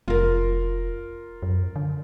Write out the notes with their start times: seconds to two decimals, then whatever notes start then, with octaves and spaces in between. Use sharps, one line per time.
0.08 F1 F4 A#4
1.43 F#2
1.76 D3